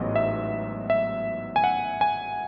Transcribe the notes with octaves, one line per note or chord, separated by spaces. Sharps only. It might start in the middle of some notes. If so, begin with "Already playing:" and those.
Already playing: A1 G#2 F#3 B3 D#5
E5
E5
G#5
F#5
G#5